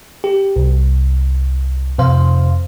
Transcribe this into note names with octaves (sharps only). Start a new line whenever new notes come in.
G4
C2
F2 C3 C5 F5